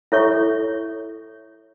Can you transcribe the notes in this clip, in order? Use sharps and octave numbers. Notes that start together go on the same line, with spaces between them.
E4 A4 C#5 E5 C#6